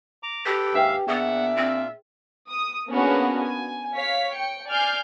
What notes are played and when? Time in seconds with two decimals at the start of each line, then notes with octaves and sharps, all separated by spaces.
0.23 A#5 D6
0.46 G4 A4 B4 G5
0.75 D#2 G#2 D4 B4 E5 F5 G5
1.08 A#2 B3 D4 G#4 E5 F#5
1.57 C4 F4
2.50 D#6
2.90 A#3 B3 C#4 D4 F#4 G#4
3.42 G#5
3.95 C#5 F5 B6
4.34 G5 C#7
4.69 D5 G#5 F6 G6 C7